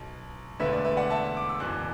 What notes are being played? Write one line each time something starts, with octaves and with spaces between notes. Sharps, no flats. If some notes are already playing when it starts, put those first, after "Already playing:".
Already playing: B1 B2
E1 D2 D3 B4 E5
D5
B4 E5
D5 F#5
E5 A5
D6
E6
F#1 E2 B2 D6 F#6